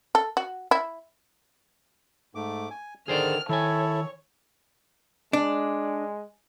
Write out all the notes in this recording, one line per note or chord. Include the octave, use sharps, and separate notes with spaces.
A4
F#4
E4
G#2 A3 D6
G#5
D3 D#3 G#4 C5 D5 F6
D#3 E4 A4 C#5 G#5
G#3 D4